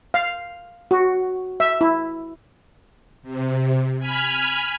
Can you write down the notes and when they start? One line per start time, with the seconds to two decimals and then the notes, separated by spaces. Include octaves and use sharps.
0.14 F5
0.91 F#4
1.60 E5
1.81 E4
3.23 C3
3.99 G#5 B5 F6